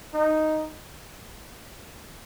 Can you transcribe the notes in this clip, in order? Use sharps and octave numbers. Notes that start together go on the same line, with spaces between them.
D#4